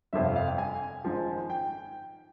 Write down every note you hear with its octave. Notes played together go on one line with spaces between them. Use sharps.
G1 F2 C3 E5
F5
F5
G5
G#5
G#1 G#2 F3
G5